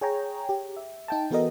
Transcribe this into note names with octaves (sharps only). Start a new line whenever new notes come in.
G#4 C#5 G5 A#5
G4
E5
D#4 G5 A5
E3 B3 F#4 A4 A#4 D#5